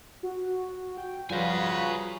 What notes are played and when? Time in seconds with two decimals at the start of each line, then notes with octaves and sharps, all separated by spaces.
0.23 F#4
0.97 G5
1.30 C#3 F3 G3 F4 F#4 B4 G#5 A#5